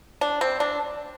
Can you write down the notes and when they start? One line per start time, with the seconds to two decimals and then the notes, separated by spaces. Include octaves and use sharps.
0.21 D4
0.41 C4
0.60 D4